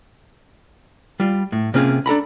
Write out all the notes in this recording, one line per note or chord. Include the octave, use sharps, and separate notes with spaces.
G3 F4
A2
C3 A#3 C4 C#4 F4 G#4
D4 A4 A#5 B5